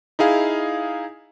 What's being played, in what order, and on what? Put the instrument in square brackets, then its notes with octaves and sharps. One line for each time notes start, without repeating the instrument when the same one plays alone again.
[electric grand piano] D#4 E4 G#4 F5